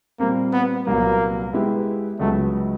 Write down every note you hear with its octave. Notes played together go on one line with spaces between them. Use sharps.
A#2 G3 A#3 C4
B3
C2 A#2 F#3 A#3 B3
G#3 B3 E4 G4 B4
C#2 C#3 F#3 A3 B3